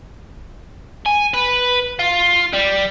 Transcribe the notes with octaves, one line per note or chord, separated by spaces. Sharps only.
G#5
B4
F4
G3